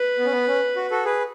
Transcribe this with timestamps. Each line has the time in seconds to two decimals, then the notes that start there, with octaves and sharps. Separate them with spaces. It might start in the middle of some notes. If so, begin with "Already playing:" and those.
Already playing: B4
0.18 B3
0.25 C#4
0.32 B3
0.47 C#4
0.76 F#4
0.91 F#4 A4
1.05 G#4 B4